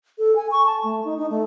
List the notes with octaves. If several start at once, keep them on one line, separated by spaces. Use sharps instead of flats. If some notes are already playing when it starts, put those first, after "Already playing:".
A4
G#5
C#6
A5
A3
D#4
D#4
A3